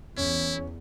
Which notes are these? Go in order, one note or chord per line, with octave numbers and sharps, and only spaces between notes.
E2 C#4 E4